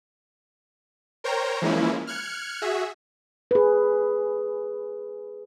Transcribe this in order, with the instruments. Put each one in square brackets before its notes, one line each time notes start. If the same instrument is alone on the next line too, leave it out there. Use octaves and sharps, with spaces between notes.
[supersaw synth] A#4 C5 C#5 G5 A#5
E3 F3 G#3 A#3 C#4 E4
F6 F#6 G#6 C#7
F#4 G#4 E5
[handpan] G#4 B4